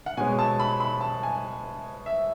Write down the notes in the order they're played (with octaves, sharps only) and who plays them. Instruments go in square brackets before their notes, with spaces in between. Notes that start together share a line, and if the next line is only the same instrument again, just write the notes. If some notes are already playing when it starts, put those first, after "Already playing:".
[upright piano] F#5
B2 G#3 C#4 G#5
A5
B5
B5
A5
G#5
E5